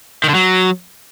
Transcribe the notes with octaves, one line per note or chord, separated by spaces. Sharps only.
D#3
D3
F#3